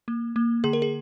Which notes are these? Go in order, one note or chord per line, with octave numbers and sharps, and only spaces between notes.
A#3
A#3
D3 G#4
A#4
G#4